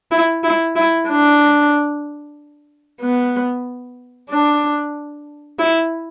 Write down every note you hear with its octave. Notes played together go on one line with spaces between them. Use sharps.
E4
E4
E4
D4
B3
D4
E4